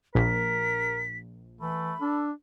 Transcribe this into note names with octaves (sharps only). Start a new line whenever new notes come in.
A#1 A#4 B6
E3 A3 B5
D4 A4